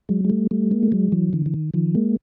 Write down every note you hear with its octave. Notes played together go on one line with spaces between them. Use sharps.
F#3 G#3
G#3
G3 A3
G3 A3
G#3 A#3
A3
F#3 G#3
E3 F#3
D3 E3
E3
D#3
D#3 F3
G#3 A#3